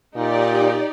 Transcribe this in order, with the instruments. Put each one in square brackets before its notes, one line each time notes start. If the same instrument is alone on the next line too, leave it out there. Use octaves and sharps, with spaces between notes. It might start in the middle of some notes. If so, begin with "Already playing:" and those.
[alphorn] A#2 [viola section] D#4 G4 D5